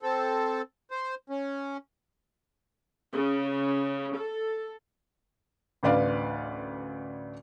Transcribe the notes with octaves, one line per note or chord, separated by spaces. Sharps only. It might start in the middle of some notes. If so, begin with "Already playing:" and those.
C4 A4
C5
C#4
C#3
A4
A1 D2 B4 D5 F5